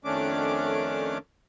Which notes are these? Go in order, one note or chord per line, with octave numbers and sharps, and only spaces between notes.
F2 D#3 A3 C#4 D4 D6